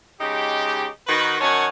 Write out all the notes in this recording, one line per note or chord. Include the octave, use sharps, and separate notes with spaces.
C#3 G#3 D#4 G4
D#3 F#4 B4
F#2 D#3 C#5 F#5 G#5 A5